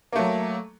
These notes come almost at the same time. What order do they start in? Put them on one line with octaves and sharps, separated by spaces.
A#3 A3 F#3